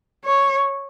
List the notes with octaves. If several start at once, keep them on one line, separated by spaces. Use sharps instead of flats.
C#5